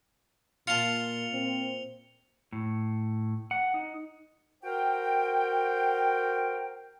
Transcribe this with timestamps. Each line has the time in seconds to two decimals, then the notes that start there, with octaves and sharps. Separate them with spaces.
0.67 A#2 F4 A5 C#7 F7 G7
1.32 A#2 C4
2.53 A2
3.51 F#5
3.74 D#4
4.63 F#4 A#4 C5 G5